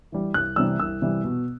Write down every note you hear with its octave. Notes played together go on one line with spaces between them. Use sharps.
E3 G3
C2 F#6
C3 E3 G3 E6
C2 E6
C3 E3 G3
B2